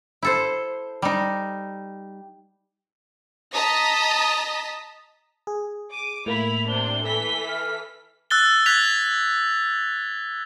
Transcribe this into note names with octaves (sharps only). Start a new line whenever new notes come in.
E4 A4 C5
G3 D#4
D#5 A5 A#5 D#6 B6
G#4
D6 D#7
A2 A#3 E4 B5 F7
C3 D4 G7
E3 A4 B6
F6
E6 F#6 A6 G7
F#6 G#6 A6 B6 F7